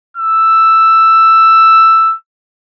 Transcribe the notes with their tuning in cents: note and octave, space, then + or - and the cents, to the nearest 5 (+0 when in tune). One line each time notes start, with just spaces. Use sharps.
E6 +5